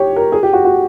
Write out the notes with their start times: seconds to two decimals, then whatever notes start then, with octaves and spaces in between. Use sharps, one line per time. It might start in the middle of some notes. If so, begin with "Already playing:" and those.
Already playing: G4 C#5
0.16 A#4
0.32 G#4
0.43 G4
0.53 F#4
0.65 F#4